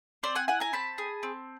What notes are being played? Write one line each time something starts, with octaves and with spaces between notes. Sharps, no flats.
C4 C5 D5
F#5 G#5
E4 F#5 G#5
G#5 A#5
C4 A5 B5
G#4
C4